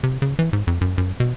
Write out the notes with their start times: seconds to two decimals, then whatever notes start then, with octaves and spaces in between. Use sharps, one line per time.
0.03 C3
0.22 C#3
0.39 E3
0.53 G#2
0.67 F2
0.81 F#2
0.98 F#2
1.20 B2